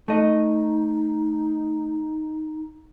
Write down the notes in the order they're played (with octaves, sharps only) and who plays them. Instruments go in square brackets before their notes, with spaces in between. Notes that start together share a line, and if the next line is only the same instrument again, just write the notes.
[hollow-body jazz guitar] A3 D#5 [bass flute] D#4